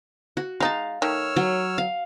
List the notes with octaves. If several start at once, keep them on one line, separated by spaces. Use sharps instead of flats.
F#4
G#3 D#4 F5 A5
D#3 A3 C#5 E6 F6
F#3
F5